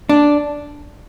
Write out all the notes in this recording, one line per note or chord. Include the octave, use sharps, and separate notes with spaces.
D4